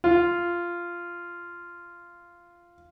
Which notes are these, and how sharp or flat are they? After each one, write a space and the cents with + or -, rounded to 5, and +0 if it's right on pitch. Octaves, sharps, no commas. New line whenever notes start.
F4 -10